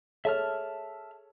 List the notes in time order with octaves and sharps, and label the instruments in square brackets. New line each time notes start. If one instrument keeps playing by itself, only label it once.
[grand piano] G#4 A4 C#5 [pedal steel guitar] E5 A5 F6